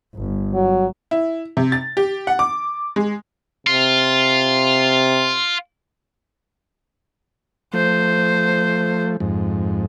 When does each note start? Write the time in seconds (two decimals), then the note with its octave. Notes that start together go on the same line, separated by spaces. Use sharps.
0.15 G1
0.54 F#3
1.11 E4
1.57 C3
1.72 A6
1.97 G4
2.27 F#5
2.39 D6
2.96 G#3
3.67 C3 F4
7.74 F3 A3 C5
9.20 F2 G#2